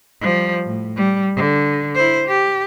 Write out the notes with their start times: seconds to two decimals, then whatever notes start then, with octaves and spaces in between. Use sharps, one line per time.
0.21 F3 G3
0.66 A2
0.96 G3
1.36 D3
1.95 E4 C5
2.28 G4